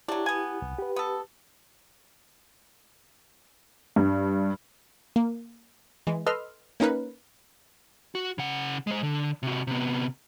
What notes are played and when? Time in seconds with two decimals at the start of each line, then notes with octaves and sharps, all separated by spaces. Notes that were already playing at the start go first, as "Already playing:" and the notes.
0.08 F#3 D4 E4 G4
0.26 B3 G#5
0.62 C2
0.79 G4 B4
0.96 B3 A4
3.96 G2
5.16 A#3
6.07 E3 G#3
6.26 A4 B4 D#5 C6 E6 F6
6.80 A#3 C#4 D#4 A#4 B4
8.15 F#4
8.38 C#3 F#5
8.87 G#3 C5
9.03 D3
9.43 C3 F#4
9.67 C3 B3